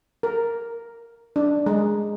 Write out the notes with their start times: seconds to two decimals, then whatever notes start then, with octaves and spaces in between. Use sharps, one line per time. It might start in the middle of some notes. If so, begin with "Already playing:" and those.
0.23 A#4
1.36 D4
1.66 G#3